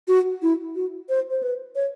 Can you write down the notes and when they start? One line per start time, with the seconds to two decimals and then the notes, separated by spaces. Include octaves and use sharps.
0.08 F#4
0.42 E4
0.76 F#4
1.09 C5
1.31 C5
1.43 B4
1.75 C#5